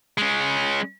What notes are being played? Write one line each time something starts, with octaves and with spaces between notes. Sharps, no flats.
G#3 C#4